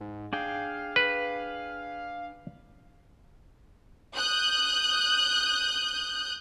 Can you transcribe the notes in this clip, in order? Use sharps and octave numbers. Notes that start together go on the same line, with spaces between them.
G#2
D4 G#4 F5 G5
B4
D#6 F#6 G6